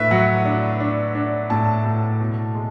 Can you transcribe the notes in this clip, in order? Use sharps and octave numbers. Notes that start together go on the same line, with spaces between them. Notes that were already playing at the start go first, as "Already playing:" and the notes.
Already playing: A2 D4 B4 E5
F#3 F#5
D4
D4
D4
A2 A5
A2
B2
G#3